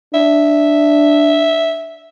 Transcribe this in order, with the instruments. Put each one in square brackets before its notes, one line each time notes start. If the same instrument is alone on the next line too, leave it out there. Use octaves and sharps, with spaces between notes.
[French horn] D4 [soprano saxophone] E5